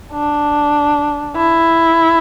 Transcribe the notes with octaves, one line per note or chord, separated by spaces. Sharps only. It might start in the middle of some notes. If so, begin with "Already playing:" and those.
D4
E4